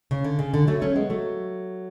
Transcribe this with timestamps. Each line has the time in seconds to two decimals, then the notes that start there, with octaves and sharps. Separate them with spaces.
0.11 C#3
0.24 D3
0.39 C#3
0.54 D3
0.67 F#3 A3
0.82 A3 C#4
0.95 G#3 B3
1.10 F#3 A3